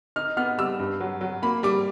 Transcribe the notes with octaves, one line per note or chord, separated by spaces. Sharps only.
D#4 F6
B3 F6
G3 E6
G2
F#3
F#3
A#3 B5
G3 D6